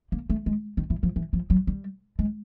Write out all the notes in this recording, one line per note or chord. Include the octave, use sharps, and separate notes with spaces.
A#3
A3
G#3
D#3
E3
F3
E3
F3
F#3
G3
G#3